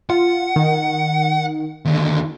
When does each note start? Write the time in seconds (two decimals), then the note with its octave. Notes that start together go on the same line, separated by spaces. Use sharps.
0.10 F4 F#5
0.56 D#3
1.85 D#2 D3